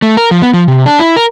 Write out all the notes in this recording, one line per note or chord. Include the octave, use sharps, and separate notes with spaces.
A3
A#4
F3
B3
F3
C3
D4
E4
A#4